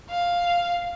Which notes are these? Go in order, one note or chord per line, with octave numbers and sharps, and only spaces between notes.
F5